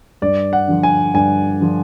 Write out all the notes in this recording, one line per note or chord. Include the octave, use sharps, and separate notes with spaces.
G2 D5
F#5
D3 F3
G#5
G2 G#5
D3 F3